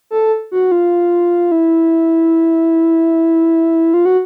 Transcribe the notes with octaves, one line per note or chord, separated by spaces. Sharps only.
A4
F#4
F4
E4
F4
F#4